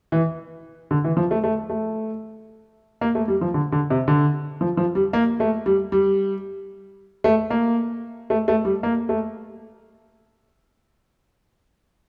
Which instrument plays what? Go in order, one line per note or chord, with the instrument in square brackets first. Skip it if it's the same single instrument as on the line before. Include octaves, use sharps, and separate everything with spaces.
[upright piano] E3
D3
E3
F3
A3
A3
A3
A#3
A3
G3
F3
D3
D3
C3
D3
F3
F3
G3
A#3
A3
G3
G3
A3
A#3
A3
A3
G3
A#3
A3